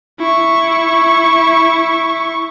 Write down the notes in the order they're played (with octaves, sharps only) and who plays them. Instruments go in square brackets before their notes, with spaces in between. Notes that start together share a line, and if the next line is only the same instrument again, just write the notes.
[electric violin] E4 C#6